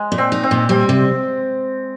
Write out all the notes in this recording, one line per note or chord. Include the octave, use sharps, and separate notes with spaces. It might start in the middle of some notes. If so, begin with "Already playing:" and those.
Already playing: G#3
A#2
C4
D#4
C4
A#2
G3 C4
C3